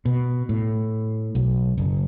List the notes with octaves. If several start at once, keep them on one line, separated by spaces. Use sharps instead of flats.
B2
A2
B1
F#1